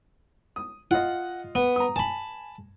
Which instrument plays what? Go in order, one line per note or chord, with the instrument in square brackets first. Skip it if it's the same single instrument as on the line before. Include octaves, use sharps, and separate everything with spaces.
[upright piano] D#6
[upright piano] F4 D#5 [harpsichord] F#5
[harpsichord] B3
[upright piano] A#5 D#6
[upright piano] G#5 [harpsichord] A5 B5